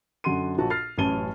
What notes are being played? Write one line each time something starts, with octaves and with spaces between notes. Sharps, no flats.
F#2 D3 F#5 C6 D#7
A#1 A#2 F#4 A5
F6 A6 C7
A1 F#2 C#4 A5 D#7 G7